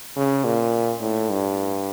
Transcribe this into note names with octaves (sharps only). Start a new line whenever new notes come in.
C#3
A#2
A2
G2